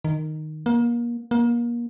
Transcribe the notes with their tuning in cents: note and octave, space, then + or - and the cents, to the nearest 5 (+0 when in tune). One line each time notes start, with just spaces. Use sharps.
D#3 -10
A#3 +30
A#3 +30